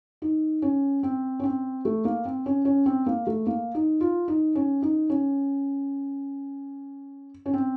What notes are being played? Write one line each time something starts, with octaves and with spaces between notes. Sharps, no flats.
D#4
C#4
C4
C#4
C4
A3
A#3
C4
C#4
C#4
C4
A#3
A3
A#3
D#4
F4
D#4
C#4
D#4
C#4
C#4
C4